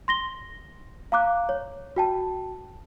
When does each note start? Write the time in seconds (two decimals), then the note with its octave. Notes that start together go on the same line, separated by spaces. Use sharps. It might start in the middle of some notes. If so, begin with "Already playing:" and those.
0.08 C6 A#6 G7
1.12 F5 A#5 D6 F#6
1.49 C#5
1.96 F#4 G5 A5